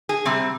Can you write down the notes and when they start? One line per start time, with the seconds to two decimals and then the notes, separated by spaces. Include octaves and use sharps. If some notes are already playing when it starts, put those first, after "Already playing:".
0.09 G#4
0.26 C3 G3 C4